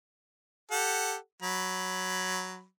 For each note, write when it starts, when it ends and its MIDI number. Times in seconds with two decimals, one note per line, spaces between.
0.71 1.15 67
0.71 1.15 69
0.71 1.15 78
1.42 2.64 54
1.42 2.64 83